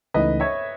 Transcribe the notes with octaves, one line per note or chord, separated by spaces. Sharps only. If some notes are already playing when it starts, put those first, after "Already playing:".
C#2 C#3 E3 A3 D#4 B4 D#5
C#5 E5